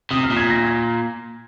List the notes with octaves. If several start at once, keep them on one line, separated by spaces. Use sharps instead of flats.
C3 D#6
F6
A#2
G#6
A#6
G#6